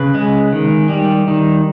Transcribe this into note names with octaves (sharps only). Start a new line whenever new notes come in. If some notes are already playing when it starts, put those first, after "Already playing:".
Already playing: C#3 B4
G#3
D#3
G3
D#3